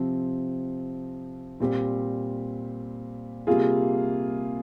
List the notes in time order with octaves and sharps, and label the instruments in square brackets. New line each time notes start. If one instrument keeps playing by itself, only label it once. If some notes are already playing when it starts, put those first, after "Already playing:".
Already playing: [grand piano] C3 F3 C4
A#2 G3 C4 G4
C3 G3 A#3 F4 G#4